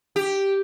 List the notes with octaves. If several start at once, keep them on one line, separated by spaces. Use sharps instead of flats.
G4